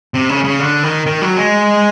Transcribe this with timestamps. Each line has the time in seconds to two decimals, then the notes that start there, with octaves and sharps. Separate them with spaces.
0.14 C3
0.29 C#3
0.44 C#3
0.60 D3
0.83 D#3
1.06 D#3
1.22 F#3
1.37 G#3